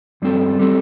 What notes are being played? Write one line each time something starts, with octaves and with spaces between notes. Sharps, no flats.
G2 G3 C4 A4
G3 C4 A4